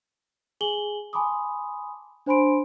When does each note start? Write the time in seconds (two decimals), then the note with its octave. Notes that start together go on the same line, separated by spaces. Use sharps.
0.61 G#4 G#5 F#7 G7
1.13 G#5 A5 B5 C6 D6 D#6
2.26 D4 C5 G#5 B5 C6 D7